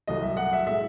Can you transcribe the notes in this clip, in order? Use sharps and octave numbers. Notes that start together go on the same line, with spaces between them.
C2 C3 F#3 A3 D#5
E5
F#5
E5
A2 G#3 E5